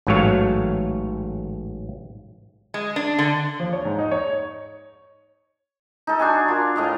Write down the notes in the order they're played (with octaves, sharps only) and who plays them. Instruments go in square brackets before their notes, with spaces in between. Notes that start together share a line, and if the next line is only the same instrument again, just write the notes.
[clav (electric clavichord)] A1 G#2 F#3 A3 C#5 F5
[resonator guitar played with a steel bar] G#3
D4
D3
[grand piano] F3
C#5
G#2
D#4
C#5
[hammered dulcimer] D#4 A4
D4 F#4 G#5
F4 A#4
A2 D#5 F5